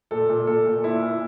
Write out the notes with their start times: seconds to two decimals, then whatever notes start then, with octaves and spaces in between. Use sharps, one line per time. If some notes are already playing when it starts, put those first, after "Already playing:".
0.11 A#2 A4
0.29 A#2
0.47 A#2 A4
0.66 A#2
0.84 A#2 E4
1.02 A#2